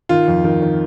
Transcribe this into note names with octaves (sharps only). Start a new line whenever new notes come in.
D#3 F4
F2
D#3
D#3